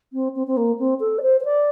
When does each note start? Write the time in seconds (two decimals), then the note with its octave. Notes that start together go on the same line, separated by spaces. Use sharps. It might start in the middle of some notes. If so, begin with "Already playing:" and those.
0.13 C4
0.36 C4
0.47 C4
0.57 A#3
0.79 C4
1.00 A4
1.18 D5
1.22 C5
1.40 C5
1.45 D5